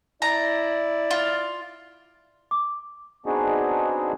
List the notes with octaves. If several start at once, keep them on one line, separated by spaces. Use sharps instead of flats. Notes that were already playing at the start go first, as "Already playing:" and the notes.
E4 D5 A#5
F4
D6
B3 C4 D4 D#4 F#4 G#4